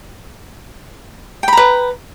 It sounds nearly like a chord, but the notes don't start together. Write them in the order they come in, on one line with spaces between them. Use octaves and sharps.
G5 B5 A#5 B4